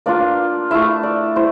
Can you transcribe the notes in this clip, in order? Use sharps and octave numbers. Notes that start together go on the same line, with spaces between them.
A#3 D4 F4 D5
A3 E4 E5
D5
E4 C5